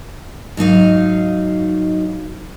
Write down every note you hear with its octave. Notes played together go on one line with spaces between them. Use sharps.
G#2 F#3 D#4 F5